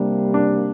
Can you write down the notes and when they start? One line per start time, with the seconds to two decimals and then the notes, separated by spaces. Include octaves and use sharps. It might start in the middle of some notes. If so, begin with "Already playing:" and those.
Already playing: C3 G3 A#3 D4
0.34 D4